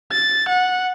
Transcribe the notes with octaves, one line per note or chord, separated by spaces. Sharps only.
A6
F#5